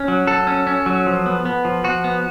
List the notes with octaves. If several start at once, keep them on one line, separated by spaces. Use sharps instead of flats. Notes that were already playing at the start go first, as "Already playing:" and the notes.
Already playing: C#4
F#3
F#3 A4
C#4
C#4
F#3
F3
B3
B3
F3
F3 F#4
B3